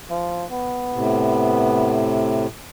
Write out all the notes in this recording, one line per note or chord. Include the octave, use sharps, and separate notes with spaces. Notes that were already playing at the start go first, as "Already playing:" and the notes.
F3
B3
A2 C3